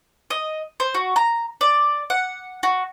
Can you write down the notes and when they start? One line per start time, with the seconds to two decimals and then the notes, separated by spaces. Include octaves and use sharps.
0.30 D#5
0.80 C5
0.94 F#4
1.16 A#5
1.61 D5
2.10 F#5
2.63 F#4